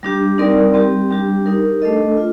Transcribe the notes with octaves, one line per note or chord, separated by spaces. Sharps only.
G3 D4 G4
G3 C4 D#4 A#4 D5
G3 C4 G4
G3 D4 G4
D#4 G4 A#4
A3 D4 A4 D#5
F4